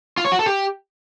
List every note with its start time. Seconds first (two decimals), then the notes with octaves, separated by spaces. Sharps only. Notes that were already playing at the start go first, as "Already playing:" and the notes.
0.17 F4
0.25 C#5
0.32 F#4
0.39 A4
0.46 G4